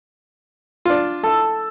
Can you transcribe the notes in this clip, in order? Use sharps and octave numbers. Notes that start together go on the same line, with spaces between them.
D4 F4
A4